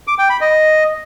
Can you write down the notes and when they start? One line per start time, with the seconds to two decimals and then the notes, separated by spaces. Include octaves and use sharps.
0.07 D6
0.19 G5
0.30 B5
0.41 D#5